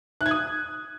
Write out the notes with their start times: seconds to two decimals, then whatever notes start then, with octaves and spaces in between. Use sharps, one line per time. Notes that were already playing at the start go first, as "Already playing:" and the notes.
0.21 F#6
0.26 G#6
0.31 D#6